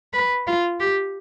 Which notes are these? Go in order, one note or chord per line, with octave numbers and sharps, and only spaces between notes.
B4
F4
G4